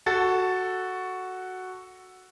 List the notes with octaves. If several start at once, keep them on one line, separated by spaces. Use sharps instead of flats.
F#4 A4 A6